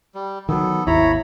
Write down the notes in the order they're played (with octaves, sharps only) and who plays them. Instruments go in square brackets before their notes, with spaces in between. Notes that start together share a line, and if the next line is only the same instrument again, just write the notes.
[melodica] G3
[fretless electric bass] D#3 F#3 [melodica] B3 A4
[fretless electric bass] G#1 D#2 [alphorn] E4 [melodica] C#5 A#5 B5